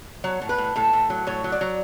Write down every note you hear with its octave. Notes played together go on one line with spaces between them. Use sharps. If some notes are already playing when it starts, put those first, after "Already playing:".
F#3 C#5
A2
B4
A2
A2 A4
A2
F#3
A2 C#5
F#3
D5
F#3